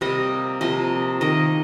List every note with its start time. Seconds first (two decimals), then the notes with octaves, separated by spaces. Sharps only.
0.01 C3 G3 A#3 D#5
0.61 C3 F3 A#3 D#5
1.21 D#3 A#3 D#5